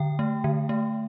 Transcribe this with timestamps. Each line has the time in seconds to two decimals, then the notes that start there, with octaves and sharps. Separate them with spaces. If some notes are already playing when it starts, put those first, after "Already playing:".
Already playing: D3 G5
0.19 A3
0.44 D3
0.69 A3